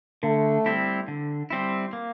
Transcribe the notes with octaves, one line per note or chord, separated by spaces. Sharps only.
D3 A3
G3 C4 E4
D3
G3 C4 E4
A#3